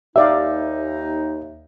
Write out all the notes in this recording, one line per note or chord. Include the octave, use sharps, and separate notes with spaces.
D#2 D#4 G4 D5 E5 F5